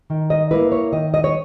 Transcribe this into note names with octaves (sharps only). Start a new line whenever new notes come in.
D#3
D#5
A#3 E4 B4
C#5
D#3 D#5
D#5
C#5